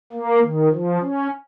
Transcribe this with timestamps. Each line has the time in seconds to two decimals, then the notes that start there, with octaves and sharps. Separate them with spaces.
0.13 A#3
0.42 D#3
0.71 F3
1.01 C#4